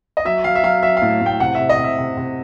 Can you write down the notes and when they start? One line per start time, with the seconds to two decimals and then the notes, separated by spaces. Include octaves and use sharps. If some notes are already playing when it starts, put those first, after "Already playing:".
0.17 D#5
0.25 F#3 E5
0.44 F#3 F5
0.55 E5
0.63 F#3 F5
0.83 F#3 E5
0.97 F5
1.02 A2
1.21 A2 G5
1.40 C3 F#5
1.55 C3 E5
1.69 D#5
1.79 C3
1.84 E5
1.98 C3
2.17 C3